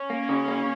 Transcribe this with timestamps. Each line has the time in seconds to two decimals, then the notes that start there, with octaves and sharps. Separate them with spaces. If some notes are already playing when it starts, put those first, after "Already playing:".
Already playing: C#4
0.10 A#3
0.29 C#3
0.48 A#3